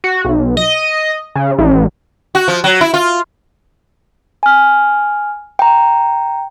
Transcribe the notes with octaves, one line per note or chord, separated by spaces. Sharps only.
F#4
B1
D#5
C#3
A1
F#4
F3
F#3
E4
F4
G#5 F6
G5 A#5